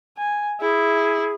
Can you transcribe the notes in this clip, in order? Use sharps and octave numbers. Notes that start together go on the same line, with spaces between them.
G#5
E4 G#4